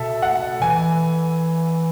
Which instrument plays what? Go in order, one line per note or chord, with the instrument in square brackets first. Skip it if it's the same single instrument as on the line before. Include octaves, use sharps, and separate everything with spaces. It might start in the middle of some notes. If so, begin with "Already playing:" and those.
Already playing: [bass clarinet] B2 [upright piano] A4 E5
[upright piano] F#5
[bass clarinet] E3 [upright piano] G#5